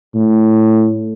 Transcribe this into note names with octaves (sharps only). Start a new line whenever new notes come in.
A2